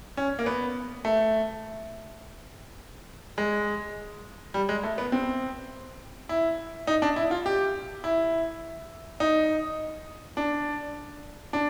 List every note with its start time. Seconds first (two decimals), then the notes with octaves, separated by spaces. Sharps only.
0.17 C#4
0.39 A#3
0.46 B3
1.05 A3
3.38 G#3
4.54 G3
4.69 G#3
4.83 A3
4.98 B3
5.12 C4
6.29 E4
6.87 D#4
7.02 D4
7.16 E4
7.31 F4
7.46 G4
8.04 E4
9.20 D#4
10.37 D4
11.53 D4